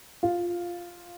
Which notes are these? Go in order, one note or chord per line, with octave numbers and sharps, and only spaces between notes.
F4